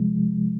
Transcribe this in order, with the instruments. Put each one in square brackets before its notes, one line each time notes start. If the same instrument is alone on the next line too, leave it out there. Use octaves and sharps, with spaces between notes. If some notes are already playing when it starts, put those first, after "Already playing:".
Already playing: [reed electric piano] C3 F3 G#3